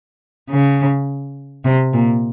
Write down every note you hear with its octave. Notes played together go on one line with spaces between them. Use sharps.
C#3
C3
A#2